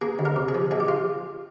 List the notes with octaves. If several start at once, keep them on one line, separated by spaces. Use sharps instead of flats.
A#3 G#4
D2
A#4
C3
G#4
F3
A#1 G#4
G4
F4